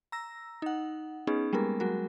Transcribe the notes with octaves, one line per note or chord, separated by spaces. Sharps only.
A#5 E6 A#6
D#4 F#5
B3 C#4 D#4 G#4
G3 G#3 A#3 B3 A#4
F#3 G#3 F#4 A#4